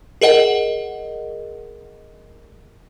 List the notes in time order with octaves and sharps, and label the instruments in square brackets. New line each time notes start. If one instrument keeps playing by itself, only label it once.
[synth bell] G#4 A#4 D#5 F#5